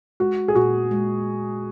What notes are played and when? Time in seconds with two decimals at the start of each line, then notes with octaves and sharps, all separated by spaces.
0.20 G#3 F#4
0.48 G#4
0.55 A#2 F#4
0.91 G#3